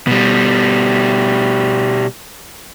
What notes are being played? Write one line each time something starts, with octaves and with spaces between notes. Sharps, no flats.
B2 G3